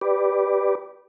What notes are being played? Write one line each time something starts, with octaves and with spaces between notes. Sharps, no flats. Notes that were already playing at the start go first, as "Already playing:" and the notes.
G4 B4 D5